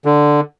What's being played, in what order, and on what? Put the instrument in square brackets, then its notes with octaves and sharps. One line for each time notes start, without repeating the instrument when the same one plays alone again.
[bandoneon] D3